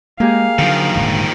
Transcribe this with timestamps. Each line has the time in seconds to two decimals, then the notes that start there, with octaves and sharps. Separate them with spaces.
0.20 G#3 A#3 G4 G#4 F5
0.59 D3 D#3 F3 F#3
0.96 D#1 G#2 D3